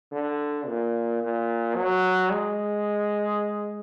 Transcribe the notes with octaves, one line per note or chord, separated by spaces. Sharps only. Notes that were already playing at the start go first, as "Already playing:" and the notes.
D3
A#2
A#2
F#3
G#3